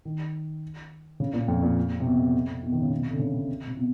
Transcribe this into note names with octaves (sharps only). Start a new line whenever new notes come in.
D#3
C#3
A#2
F2
A#2
C3
B2
B2
D#3
C#3
B2
C3
D3
C#3
C3
C3
B2